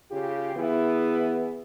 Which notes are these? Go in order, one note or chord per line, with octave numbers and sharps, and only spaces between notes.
C#3 F4 G4
E3 B3 E4 G#4